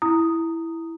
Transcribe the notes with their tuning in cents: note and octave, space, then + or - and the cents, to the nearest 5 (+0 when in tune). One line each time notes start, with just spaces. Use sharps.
E4 +0 A#5 -15 D#6 +0